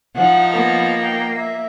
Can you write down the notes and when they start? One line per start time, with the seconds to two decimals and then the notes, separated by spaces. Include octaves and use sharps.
0.16 F3 D#4 F#5
0.52 A#3 B3
1.04 G5
1.36 E5